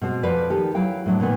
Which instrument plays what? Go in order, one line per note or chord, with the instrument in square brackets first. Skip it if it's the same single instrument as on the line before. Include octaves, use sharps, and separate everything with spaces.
[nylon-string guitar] B2 G#3 C4
F2 F3 F4 B4 D5
D#3 G4 A4
F#3 E4 F5 G5
A2 F#3 D4
A#2 D#3 B3